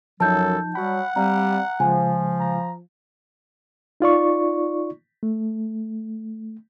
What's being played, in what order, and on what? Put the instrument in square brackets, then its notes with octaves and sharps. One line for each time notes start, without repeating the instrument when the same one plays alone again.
[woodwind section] F#2 F#3 [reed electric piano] F3 D#4 [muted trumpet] A4 [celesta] A5 G6
[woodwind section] F#3 G3 [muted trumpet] F#5 [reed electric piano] B5
[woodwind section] G3 [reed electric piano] C4 F5 [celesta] A#5
[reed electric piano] C#3 G#3 F4 [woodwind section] F3 [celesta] G#5
[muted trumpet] A#5
[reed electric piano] D#4 F4 D5 C#6
A3